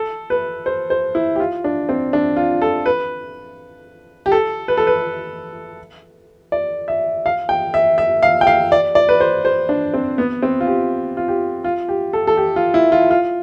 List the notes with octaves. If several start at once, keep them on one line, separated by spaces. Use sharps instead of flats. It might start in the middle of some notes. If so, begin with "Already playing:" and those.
Already playing: A4
B4
C5
C5
E4
G4
F4
D4
C4
D4
F4
A4
B4
G4
A4
B4
A4
B4
D5
E5
F5
G5
E5
E5
F5
G5
F5
D5
D5
B4
C5
C5
D4
C4
B3
C4
F4
G4
F4
G4
F4
G4
A4
A4
G4
F4
E4
F4
F4